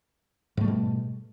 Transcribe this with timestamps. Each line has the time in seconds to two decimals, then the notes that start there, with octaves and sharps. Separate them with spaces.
0.57 G#2
0.61 A3
0.64 G3
0.68 B2